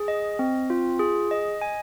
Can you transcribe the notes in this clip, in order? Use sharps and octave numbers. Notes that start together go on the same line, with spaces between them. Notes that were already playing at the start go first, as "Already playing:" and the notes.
Already playing: G#4
D#5
C4
F4
G#4
D#5
G#5